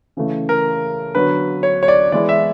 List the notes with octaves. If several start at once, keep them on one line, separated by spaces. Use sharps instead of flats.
C#3 E3 A3
A#4
D3 F#3 B3 B4
C#5
C#5
D5
E3 G#3 B3 E4 D5
E5